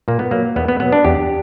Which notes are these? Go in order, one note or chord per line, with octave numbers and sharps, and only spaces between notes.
A#2 A#3
B3
F#3 A#3
E2 B3
B3
B2 F#3 B3
D4
E2 G4